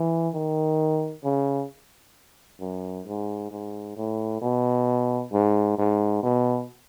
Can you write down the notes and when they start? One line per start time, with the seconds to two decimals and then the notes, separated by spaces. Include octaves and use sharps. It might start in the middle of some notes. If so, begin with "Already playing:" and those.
Already playing: E3
0.34 D#3
1.24 C#3
2.60 F#2
3.06 G#2
3.51 G#2
3.97 A2
4.42 B2
5.33 G#2
5.78 G#2
6.23 B2